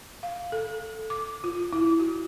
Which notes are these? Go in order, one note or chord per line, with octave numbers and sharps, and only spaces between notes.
F5
A4
D6
F4
E4
F#4